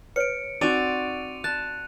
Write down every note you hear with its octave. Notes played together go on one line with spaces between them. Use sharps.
B4 C#5 C#7 D7
C4 D#4 F#4 D5 D#7 F7
A5 F#6